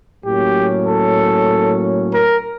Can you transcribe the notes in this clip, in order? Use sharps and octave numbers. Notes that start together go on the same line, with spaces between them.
A2 F#3 A#3 C#4 G4
A4
A#4